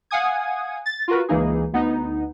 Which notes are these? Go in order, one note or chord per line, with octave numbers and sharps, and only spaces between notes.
F5 F#5 G#5 D#6 G#6
A6
F4 F#4 A#4 B4
C#2 E3 A#3 D#4 G#4
D2 B3 D#4